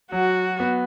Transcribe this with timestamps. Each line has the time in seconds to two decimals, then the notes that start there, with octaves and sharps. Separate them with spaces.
0.12 F#3 F#4
0.60 B3